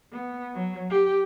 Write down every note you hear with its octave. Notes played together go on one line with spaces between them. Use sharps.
B3
F#3
G4